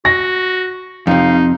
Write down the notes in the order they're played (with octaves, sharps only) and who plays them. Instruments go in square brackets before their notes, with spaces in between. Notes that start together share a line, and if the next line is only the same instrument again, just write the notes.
[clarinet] F#4 [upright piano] A#6
[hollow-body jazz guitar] F2 C3 [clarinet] D#4 [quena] F5